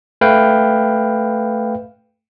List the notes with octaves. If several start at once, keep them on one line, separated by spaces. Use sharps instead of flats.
A3 B4 F5 G5